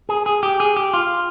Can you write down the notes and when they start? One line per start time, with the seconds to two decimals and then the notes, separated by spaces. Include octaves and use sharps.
0.09 G#4
0.26 G#4
0.43 G4
0.60 G#4
0.76 G4
0.94 F4